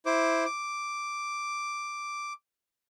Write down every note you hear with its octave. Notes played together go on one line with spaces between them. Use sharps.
E4 C5 D6
D6